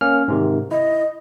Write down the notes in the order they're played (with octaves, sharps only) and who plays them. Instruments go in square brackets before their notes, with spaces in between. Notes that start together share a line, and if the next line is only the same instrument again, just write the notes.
[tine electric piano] A#3 C#4 F6
G#2 C3 D#3
[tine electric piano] E4 [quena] D#5